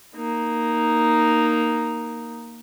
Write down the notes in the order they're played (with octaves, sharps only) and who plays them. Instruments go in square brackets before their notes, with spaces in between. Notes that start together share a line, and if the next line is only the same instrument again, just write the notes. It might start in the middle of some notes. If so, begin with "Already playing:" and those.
[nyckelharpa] A#3 D#4